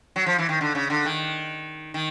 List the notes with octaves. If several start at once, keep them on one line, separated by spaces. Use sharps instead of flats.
F#3
F3
E3
D#3
D3
C#3
D3
D#3
D#3